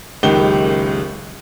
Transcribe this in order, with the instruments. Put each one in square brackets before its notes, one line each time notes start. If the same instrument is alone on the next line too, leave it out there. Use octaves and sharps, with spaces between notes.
[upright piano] F#1 C#2 D#3 G4 G7